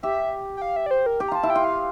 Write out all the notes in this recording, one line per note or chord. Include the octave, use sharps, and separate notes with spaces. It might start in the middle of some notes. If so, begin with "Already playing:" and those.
G4 E5
G5
F5
E5
D5
C5
A#4
G4 G5
A#5
F4 A5
E4
G5
F4
F5